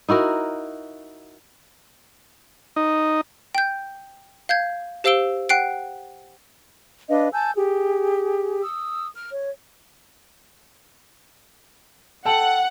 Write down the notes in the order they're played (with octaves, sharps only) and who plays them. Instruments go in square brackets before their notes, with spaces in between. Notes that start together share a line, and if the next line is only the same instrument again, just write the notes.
[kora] D#4 E4 F#4 A#4
[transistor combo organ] D#4
[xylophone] G5 G6
F5 G6 G#6
G4 C5 F5 E6 D7 G7
F#5 G5 F#6 C7 D7
[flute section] D4 B4 D#5 F5
G#5 A5 E6 G6
G4 G#4
D#6 E6
F6
C#5
[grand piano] A4 G5 A5 [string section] F#5